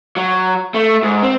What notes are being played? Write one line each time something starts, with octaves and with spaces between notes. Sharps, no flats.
F#3
A3
G#2
C4